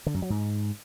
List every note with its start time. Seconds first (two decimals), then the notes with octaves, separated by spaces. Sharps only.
0.06 D3
0.14 F#2
0.22 F#3
0.30 G#2